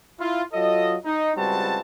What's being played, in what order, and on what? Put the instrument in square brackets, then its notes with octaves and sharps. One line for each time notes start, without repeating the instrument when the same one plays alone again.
[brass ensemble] E4 F4
F#3 F4 A4 D#5
D#4
C#2 G3 C4 F#4 B4 A5